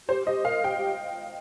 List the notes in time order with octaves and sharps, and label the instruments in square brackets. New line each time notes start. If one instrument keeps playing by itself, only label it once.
[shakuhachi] G4 [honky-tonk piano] C5
[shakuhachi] G4 [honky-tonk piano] D#5
[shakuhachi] A#4 [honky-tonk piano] F5
[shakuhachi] G4 [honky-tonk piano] G5
[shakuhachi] G4